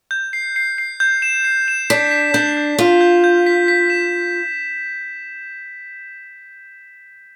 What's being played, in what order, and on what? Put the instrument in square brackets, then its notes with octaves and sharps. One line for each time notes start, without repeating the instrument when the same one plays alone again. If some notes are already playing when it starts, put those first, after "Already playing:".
[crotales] G6
C7
C7
C7
G6
E7
C7
E7
[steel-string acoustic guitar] D4 [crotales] B6
[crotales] B6
[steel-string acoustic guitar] D4 [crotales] G6
[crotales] G6
[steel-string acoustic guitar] F4 [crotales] B6
[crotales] G6
G6
B6
B6
E7